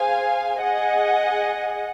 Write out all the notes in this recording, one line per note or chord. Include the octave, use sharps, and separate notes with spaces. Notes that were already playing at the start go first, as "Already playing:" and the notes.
Already playing: G#4 C5 F5 G#5
G#4 D#5 F#5